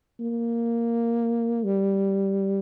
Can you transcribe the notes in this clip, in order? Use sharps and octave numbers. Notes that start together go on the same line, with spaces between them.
A#3
G3